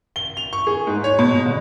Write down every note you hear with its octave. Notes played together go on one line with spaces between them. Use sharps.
G7
F7
C#6
G#4
G#2
C#5
B2
G1